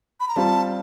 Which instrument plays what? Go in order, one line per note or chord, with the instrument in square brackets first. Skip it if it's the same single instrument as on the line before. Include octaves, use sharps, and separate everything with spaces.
[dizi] B5
A#5
[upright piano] G3 C4 F4 [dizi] A5